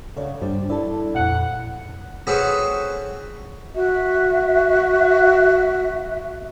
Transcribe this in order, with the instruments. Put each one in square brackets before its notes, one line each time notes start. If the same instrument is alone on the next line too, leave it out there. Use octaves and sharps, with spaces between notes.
[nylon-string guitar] C#3 E5 F#5 [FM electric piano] A4 C#5 D5
[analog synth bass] G2 [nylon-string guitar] G3 D4 [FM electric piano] C5
[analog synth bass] E4 [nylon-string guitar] A4 [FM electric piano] D5 A5
[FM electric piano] F2 A#2 [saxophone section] F#5
[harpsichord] C4 C#4 F#4 G#4 A4 B4
[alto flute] F#4 [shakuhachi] E5